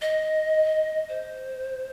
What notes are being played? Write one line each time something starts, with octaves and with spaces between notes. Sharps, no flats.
D#5
C5